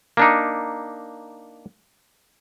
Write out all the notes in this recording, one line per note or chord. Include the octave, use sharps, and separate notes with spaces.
A#3 D4 D#4